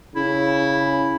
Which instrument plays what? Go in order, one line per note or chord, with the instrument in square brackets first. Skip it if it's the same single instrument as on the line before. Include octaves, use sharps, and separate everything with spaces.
[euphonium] C#3 [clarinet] E4